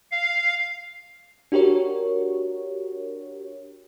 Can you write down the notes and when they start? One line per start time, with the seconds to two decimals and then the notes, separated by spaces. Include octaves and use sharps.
0.12 F5
1.52 D4 F#4 G4 A#4 C#5